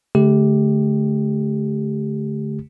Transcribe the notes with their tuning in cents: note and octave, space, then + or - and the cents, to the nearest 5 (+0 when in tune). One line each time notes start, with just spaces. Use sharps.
D3 -35 A3 -35 G4 +0